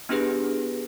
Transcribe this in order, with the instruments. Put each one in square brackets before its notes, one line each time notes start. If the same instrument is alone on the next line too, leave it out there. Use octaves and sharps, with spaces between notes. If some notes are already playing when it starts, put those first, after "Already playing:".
[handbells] B3 D4 E4 G4 G#4 B4